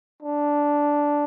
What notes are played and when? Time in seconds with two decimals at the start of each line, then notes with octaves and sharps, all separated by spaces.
0.22 D4